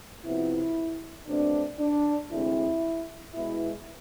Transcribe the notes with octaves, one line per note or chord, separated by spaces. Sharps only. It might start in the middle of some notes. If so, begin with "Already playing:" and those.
C3 F3 B3 E4
B2 A3 C4 D4
D4
D2 C3 G#3 C4 E4
B2 G#3 B3 E4